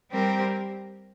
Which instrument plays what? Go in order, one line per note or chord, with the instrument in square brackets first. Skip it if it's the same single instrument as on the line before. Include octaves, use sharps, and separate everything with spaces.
[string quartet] G3 C4 G4 A#4